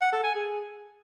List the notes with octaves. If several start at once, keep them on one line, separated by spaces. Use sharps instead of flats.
F#5
A4
G#5
G#4